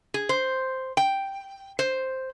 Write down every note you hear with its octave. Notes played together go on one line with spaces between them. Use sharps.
G#4
C5
G5
C5